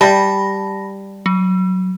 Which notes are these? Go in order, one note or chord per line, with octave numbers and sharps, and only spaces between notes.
G3 A5 B5 A#6
F#3